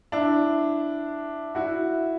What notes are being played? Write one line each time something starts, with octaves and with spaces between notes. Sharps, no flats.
D4 E4
E4 F#4